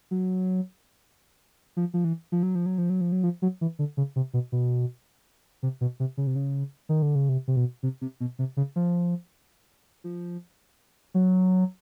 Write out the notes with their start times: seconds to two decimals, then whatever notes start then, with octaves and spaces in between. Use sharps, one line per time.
0.11 F#3
1.77 F3
1.94 F3
2.04 E3
2.32 F3
2.43 F#3
2.55 F3
2.66 F#3
2.78 F3
2.90 F#3
3.01 F3
3.12 F#3
3.24 F3
3.42 F#3
3.61 E3
3.79 D3
3.97 C#3
4.16 C3
4.34 B2
4.52 B2
5.63 C3
5.81 B2
6.00 C3
6.17 C#3
6.27 C3
6.36 C#3
6.89 D#3
7.02 D3
7.15 C#3
7.29 C3
7.48 C3
7.56 B2
7.83 C3
8.01 C3
8.20 B2
8.39 C3
8.57 C#3
8.76 F3
10.04 F3
11.14 F#3